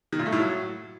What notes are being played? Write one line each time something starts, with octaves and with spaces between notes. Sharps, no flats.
D#3
A#2
A3
A2
F#3